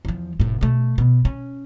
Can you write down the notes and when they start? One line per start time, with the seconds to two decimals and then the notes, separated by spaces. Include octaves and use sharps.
0.05 E2 F3
0.40 F1 A2
0.61 B2 A3
0.98 B2
1.25 C#4